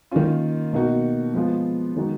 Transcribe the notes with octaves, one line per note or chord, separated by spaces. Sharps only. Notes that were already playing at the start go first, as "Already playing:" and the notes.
D#3 A#3 C#4 F4
B2 A#3 D#4 F#4
F3 G#3 B3 F4
D#3 G#3 D#4 F#4